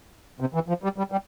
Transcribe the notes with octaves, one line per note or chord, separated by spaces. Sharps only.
C3
E3
F3
G3
G3
G3